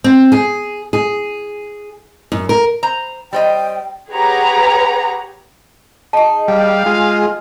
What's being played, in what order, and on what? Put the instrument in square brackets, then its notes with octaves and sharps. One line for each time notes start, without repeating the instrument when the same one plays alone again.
[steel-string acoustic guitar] C4
G#4
G#4
F#2
A#4
[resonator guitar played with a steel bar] C5 A#5
[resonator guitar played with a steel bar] G3 C5 D#5 [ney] G5
[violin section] G4 G#4 B4 C#5 F#5 A#5
[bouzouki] D#4 G#4 [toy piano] A5
[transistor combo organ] G3 [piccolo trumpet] F5
[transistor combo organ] G#3 F4